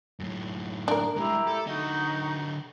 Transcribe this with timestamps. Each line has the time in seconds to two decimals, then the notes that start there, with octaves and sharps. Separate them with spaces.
0.20 F#2 A2
0.88 D4 A#4
1.16 G#3 A3 E4 G4 A#5
1.47 A4
1.67 D3 D#4 F#4 D#5